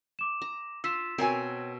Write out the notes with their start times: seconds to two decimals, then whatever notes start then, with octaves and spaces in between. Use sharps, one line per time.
0.19 D6 E7
0.42 A#5
0.84 F4 E6 B6 E7
1.18 B2 C4 A#4 C#5 G#5